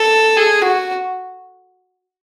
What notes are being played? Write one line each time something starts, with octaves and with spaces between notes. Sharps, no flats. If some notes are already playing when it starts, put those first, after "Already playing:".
Already playing: A4
G#4
F#4